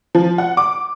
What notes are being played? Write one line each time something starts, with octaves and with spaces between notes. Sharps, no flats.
F3
F#5
D6